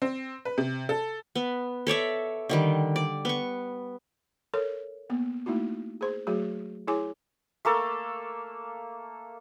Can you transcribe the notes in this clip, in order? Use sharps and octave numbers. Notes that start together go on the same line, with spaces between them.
C4
B4
C3
A4
B3
A4 C#5 D5 E5
D3 D#3 G3
D5
B3 C#6
A4 A#4 C#5
A#3 B3
A3 A#3 D#4 E4 F#4
G#4 C5
F#3 A3 F#4 G#4
E4 G#4 C#5 G#5 D6
A3 A#3 A4